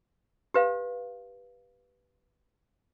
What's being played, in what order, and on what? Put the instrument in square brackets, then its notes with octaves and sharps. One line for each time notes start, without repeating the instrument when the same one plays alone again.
[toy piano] G4 B4 F5